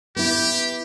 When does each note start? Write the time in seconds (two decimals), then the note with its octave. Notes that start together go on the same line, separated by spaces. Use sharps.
0.16 B3 E4 G4